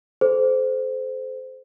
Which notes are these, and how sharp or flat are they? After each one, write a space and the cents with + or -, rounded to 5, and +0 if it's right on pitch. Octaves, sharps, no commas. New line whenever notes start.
A4 -35 C5 -20